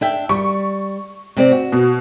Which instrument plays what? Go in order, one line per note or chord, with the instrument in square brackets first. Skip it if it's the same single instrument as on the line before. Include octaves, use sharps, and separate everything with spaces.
[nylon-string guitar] D4 E5 G5
[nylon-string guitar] G3 [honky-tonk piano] C#6
[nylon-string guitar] C3 C4 D5
F#4
[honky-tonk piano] B2